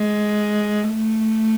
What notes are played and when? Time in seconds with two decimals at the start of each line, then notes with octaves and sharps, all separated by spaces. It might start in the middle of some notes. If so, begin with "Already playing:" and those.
Already playing: G#3
0.90 A3